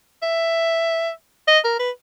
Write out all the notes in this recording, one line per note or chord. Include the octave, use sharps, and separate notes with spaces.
E5
D#5
A#4
B4